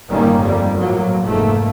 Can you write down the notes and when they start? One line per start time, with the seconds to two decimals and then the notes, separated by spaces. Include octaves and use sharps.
0.11 G1 A2 D#3 G3 A#3 C#4
0.42 F2 G3 A#3
0.80 A2 F3 F#3 A#3
1.24 F1 G#2 A3 A#3